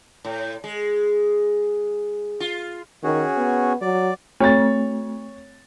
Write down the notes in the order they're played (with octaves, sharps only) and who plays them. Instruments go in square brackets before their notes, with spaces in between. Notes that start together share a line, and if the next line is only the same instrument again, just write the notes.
[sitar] A2
G#3
F4
[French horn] D#3 [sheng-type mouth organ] C#4 F#4 G#4
[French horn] B3
[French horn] F#3 [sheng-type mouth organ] D5
[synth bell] A3 C4 [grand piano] C#5 A6